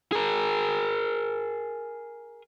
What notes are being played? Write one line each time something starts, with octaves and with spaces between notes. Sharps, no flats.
G#4 A#4